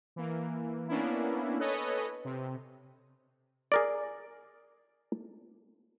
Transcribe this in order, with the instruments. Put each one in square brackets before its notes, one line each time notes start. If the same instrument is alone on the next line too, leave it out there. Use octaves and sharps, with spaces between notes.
[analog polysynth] E3 A#3
A#3 B3 C#4 D4 E4
A4 B4 C#5 D#5 G#5
C3
[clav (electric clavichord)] G#4 A#4 D5